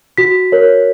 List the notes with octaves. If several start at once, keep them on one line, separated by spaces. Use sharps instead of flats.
F#4 B6
A#4 C#5